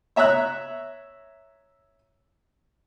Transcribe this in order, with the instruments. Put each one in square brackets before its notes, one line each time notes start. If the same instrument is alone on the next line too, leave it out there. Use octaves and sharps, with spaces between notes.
[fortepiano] C#5 E5 A#5 E6 F#6